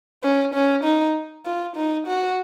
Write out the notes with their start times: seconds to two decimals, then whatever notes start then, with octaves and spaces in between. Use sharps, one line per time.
0.23 C#4
0.54 C#4
0.84 D#4
1.45 F4
1.76 D#4
2.07 F#4